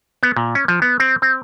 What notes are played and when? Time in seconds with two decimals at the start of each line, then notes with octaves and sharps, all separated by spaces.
0.23 B3
0.36 A#2
0.55 C#4
0.68 F3
0.82 B3
1.00 C4
1.22 C4